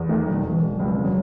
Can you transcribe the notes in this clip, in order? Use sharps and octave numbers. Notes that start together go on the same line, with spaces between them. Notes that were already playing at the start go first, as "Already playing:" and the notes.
Already playing: E2
D#3 A3
E1 F#3
E1
E3
E1
C#2 F#3
C#3
F#3